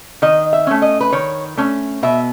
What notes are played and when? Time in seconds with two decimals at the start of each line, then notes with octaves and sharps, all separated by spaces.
0.22 D#3 D#5
0.53 E5
0.67 A3 C#4
0.82 D#5
1.00 B4
1.12 D#3 C#5
1.57 A3 C#4
2.03 B2 E5